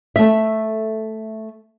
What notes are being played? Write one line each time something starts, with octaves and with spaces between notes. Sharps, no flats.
A3 E5